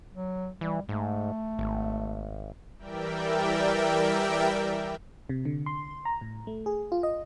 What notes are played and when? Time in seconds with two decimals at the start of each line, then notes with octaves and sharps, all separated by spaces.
0.13 F#3
0.61 E3 G3
0.89 G#2 A3
1.59 G#1
2.79 E3 G3 A#4 D5 E5 G5
5.29 C3
5.45 D3
5.66 C6
6.05 A#5
6.21 A2
6.47 A3
6.66 G#4
6.92 F4
7.03 D#5